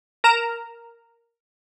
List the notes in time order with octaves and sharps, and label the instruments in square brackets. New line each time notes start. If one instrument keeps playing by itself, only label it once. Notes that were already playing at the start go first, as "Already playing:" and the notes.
[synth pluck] A#4 A#5 E7